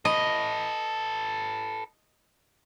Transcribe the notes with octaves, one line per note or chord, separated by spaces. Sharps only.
A4 B4 D#5